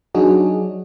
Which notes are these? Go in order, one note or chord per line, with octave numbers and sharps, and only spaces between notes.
F#3 D4 D#4 F#4 G#4